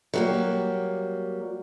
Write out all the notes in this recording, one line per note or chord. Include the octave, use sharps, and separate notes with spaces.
F#3 G3 A#3